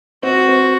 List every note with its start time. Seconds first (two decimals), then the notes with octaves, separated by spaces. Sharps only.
0.23 C4 F#4
0.49 C4